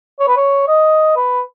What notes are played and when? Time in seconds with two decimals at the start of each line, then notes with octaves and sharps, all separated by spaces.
0.20 C#5
0.28 B4
0.37 C#5
0.68 D#5
1.16 B4